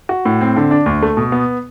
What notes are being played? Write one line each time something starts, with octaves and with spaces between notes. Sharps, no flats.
F#4
A2
C4
D3
D4
D2
A3
B2
B3